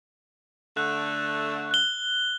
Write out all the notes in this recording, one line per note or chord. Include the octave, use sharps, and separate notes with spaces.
D3 A3 F#6
F#6 G7